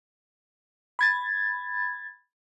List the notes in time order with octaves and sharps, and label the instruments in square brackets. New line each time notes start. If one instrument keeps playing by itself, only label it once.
[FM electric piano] B5 G#6 A6